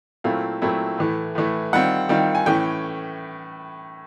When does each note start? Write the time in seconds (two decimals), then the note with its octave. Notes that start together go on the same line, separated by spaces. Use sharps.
0.24 A#2 F#3 A3 C4 E4 F5
0.62 A#2 F#3 A3 C4 E4
0.98 A2 E3 A3
1.35 A2 E3 A3
1.73 D#3 G3 C4 F4 F#5
2.09 D#3 G3 C4 F4
2.35 G#5
2.46 A2 E3 A3 C#4 G5